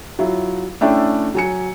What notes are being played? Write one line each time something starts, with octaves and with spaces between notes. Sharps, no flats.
F#3 E4 F4
A3 C#4 D4 E4 D5 G5
F#3 G#5 C#7